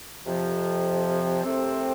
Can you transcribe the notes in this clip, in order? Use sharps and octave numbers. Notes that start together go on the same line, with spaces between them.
F2 C3 F3
C2 C3 A3 C4